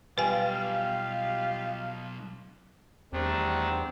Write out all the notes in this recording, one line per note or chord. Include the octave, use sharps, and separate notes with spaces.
B1 G3 F4 G4 B4 F5 G#5
E2 D#3 G3 A3 C4 D4